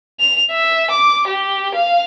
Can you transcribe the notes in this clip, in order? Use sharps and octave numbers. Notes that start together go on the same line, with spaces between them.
F7
E5
D6
G4
F5